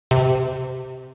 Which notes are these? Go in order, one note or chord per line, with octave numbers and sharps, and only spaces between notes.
C3